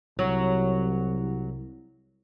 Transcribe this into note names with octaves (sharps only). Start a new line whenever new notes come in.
C2 F#3